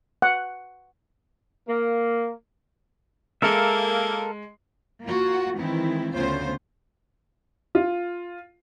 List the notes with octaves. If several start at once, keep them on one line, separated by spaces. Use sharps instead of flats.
F#5
A#3
G#3 A#3 A4 A#4 E5
A#3 F4 F#4
D#3 E3 G#3 C4 E4
D2 C#3 B3 C#4 F4 C5
F4